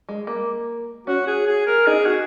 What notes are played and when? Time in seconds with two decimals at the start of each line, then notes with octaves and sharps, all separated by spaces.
0.09 G#3
0.27 A#3
1.07 C#4 F#4
1.27 G#4
1.47 G#4
1.67 A#4
1.86 C4 D#4 G#4
2.06 F#4